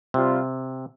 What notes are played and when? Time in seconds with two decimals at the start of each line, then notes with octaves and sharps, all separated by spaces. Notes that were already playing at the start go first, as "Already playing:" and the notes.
0.14 C3 G3 C4 F4